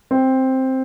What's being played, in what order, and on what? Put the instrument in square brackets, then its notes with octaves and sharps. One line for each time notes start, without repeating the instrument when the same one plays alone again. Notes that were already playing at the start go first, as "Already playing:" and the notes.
[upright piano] C4